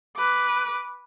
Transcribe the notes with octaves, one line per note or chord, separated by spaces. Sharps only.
B4 D6